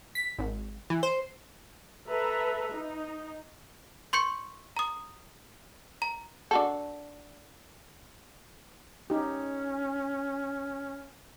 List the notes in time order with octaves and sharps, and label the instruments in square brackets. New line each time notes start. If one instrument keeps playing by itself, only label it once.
[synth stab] B6
G#1
E3
C5
[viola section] A4 B4 E5 A#5
D#4
[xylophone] C6 C#6 G6 C#7
A#5 D#6
A#5
[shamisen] D4 F#4 A4
[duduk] C#4 [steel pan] D#4 G4